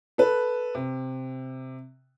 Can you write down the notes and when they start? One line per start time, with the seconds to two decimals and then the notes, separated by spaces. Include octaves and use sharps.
0.18 A4 B4
0.75 C3